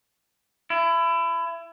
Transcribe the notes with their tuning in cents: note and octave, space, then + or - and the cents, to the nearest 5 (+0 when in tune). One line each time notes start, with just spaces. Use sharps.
E4 +25